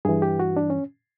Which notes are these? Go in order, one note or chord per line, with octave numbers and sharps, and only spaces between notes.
G2 E3 G#4
G4
F#4
D4
C#4